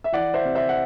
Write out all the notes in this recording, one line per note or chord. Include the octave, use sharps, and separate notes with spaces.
E5
E3 D5 F#5
C5 E5
C3
C5 E5
F#5